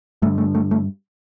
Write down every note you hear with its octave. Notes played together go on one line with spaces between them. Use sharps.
G2 D3 A3
A3
A3
A3